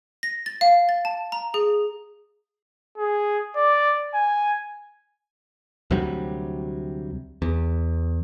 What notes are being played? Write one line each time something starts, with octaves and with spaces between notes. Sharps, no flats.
A#6
A6
F5
A6
A5
A#5
G#4
G#4
D5
G#5
D2 C3 F#3 G3
E2